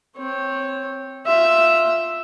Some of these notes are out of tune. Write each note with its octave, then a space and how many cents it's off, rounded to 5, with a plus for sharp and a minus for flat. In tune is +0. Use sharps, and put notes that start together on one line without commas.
C4 +0 C#5 -15
F4 +0 E5 +0